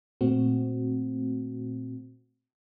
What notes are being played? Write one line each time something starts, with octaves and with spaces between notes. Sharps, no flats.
A#2 A3 C4 F#4